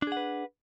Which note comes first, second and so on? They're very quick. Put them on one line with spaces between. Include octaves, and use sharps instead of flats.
D4 G#4 F#5 B4